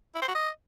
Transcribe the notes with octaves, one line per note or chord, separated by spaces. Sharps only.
E4
C5
F#4
D#5